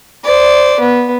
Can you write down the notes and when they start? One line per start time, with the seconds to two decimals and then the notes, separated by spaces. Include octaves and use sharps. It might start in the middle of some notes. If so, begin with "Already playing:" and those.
0.24 C5 D5
0.80 B3